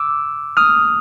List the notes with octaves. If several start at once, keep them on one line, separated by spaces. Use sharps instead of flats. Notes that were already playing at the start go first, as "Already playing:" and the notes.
Already playing: D6 E6
D#6 F6